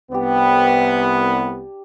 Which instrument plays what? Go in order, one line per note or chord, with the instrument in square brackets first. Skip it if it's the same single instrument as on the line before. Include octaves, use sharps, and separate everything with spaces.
[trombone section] C2 B3 [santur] D4 G4